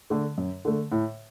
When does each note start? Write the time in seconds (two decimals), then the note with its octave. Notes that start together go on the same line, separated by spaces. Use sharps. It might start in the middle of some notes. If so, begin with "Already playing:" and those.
0.10 D3 A3
0.38 F#2
0.65 D3 A3
0.92 A2